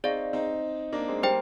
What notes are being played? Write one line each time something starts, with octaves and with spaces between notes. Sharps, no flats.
C4 D#4 G#4 D5 F5
C4 D#4
A#3 D4
G#3 C4
G3 A#3 G4 C5 G5